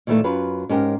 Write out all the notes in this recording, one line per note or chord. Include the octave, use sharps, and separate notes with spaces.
A#2 D#3 E3 F#3 A3 A#3
F#2 F4 B4
G#2 C#4 G4 A#4